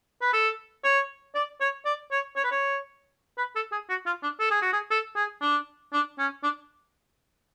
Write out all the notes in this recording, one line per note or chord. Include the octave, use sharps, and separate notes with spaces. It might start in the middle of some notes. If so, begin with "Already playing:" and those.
B4
A4
C#5
D5
C#5
D5
C#5
C#5
B4
C#5
B4
A4
G#4
F#4
F4
D4
A4
G#4
F#4
G#4
A4
G#4
D4
D4
C#4
D4